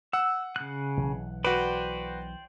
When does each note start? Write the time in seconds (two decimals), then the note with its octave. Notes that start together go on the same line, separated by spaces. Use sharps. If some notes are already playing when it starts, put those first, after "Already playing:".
0.13 F#5 E6
0.56 C#3 F#6
0.97 B1 E3
1.44 F#4 B4 C5 D5 G5